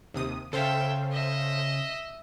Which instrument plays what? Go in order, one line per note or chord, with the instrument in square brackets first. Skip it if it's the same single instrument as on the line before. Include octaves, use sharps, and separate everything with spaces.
[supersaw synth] D#2 C3 D#6
[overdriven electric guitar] C#3 [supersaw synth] A4 C5 F5 [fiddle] E5 G5
[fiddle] D#5 E5